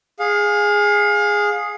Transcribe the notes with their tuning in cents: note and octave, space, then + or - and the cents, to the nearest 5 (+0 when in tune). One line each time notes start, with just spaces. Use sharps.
G#4 -5 F5 +30